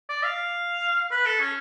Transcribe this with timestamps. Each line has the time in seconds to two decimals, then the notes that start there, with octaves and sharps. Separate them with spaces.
0.09 D5
0.23 F5
1.11 B4
1.26 A4
1.40 C#4